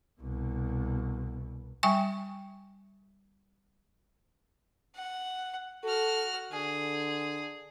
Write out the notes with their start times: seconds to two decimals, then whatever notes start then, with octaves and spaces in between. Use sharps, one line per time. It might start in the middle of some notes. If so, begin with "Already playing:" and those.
0.21 C2 B2
1.83 G3 E5 G5 G#5 C#6
4.95 F#5
5.84 F#4 A4 F6
6.53 D3 G#4